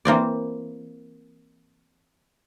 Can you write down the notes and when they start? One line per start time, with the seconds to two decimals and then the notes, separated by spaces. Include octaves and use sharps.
0.05 E3 A#3 C4 D5